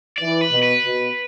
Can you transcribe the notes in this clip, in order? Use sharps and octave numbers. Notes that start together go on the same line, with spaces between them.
E3 D5
B4
B2
B4
B2